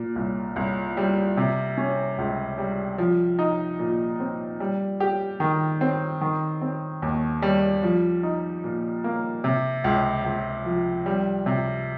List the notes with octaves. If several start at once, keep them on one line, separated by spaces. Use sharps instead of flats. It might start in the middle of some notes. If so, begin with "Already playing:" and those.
Already playing: A#2
C2
C2
G3
C3
C#4
C#2
G3
F3
D#4
A#2
C4
G3
G4
D#3
C4
D#3
C4
D#2
G3
F3
D#4
A#2
A#3
C3
C#2
C#2
F3
G3
C3